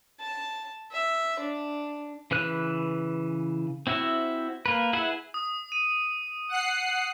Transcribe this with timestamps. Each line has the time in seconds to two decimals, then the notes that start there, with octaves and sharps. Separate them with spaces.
0.20 A5
0.92 E5
1.40 D4
2.31 C#3 E3 B4 F#6
3.87 C4 E4 F#4 E5
4.66 A#3 B4
4.93 E4 G#4 B4 E5 F#5
5.34 D#6
5.72 D#7
6.49 F#5 F#6 C7